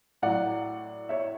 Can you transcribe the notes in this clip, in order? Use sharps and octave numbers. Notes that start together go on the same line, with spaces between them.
A2 F#3 D5 F#5
C#5 E5